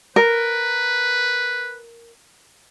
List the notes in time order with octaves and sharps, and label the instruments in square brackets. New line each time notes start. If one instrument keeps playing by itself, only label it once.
[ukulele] A#4 [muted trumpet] B4